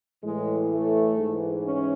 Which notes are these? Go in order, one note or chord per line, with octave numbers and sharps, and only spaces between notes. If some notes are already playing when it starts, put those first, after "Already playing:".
A2 E3 G#3
A3
G#2 E3
C#4